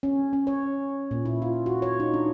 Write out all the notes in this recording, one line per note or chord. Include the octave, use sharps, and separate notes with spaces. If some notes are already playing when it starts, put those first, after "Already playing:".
C#4
C#4
C#5
A#2
E4
F4
F#4
C#5
D#4
D4